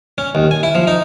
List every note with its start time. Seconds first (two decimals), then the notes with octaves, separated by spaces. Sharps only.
0.18 C#4
0.35 D#2
0.51 G#5
0.63 E4
0.75 F3
0.87 D#4